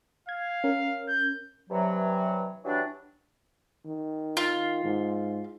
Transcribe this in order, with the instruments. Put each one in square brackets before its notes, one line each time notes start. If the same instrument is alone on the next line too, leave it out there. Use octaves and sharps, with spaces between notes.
[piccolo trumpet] F5 [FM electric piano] G#6
[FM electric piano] C#4 A#4
[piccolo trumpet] G6
[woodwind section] G2 C3 E3 F#3
E3 F#3 G3 D4
[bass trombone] D#3
[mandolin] F4
[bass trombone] G#2